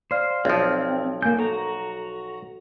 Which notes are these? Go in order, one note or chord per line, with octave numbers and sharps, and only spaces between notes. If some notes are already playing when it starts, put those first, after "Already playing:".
C5 D5 F5 F6
B1 F3 C4
A#3 G#5 G6
F#4 A4 A#5